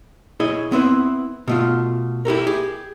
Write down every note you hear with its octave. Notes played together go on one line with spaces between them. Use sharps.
E4 G#4 C#5 D#5
B3 C4 E4 B4
B2 A3 F4
E4 G4 A4 A#4
G4 G#4